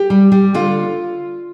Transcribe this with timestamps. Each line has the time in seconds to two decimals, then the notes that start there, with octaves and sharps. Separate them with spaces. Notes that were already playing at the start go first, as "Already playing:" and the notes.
Already playing: G4
0.10 G3
0.32 G3
0.54 D3 F4